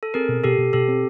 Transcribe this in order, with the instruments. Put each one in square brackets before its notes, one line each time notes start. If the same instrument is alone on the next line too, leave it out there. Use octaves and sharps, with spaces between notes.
[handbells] A4
[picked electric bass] C4 [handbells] G#4 A#4
[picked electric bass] B2
[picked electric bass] B2 [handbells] G4 A4
[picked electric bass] B2
[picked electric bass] B2 [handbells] G4 A4
[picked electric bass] C4